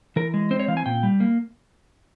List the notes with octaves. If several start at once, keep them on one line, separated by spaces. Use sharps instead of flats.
E3 A#4
G#3
C4 C5
C#5
E3 F5
G#5
A#2 G5
G3
A#3